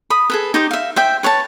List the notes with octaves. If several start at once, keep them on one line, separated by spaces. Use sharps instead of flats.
B5 D#6
G#4 A4 B4
D#4 G4 C5
E5 F5
C5 E5 G5
B4 C#5 F5 A5